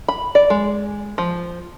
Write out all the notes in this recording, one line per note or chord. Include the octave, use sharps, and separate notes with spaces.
B5
D5
G#3
F3